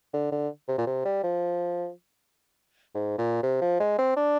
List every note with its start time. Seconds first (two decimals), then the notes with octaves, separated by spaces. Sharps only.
0.14 D3
0.32 D3
0.68 C3
0.78 A#2
0.86 C3
1.05 G3
1.24 F3
2.95 G#2
3.18 A#2
3.43 C3
3.61 F3
3.80 G#3
3.98 C4
4.16 D4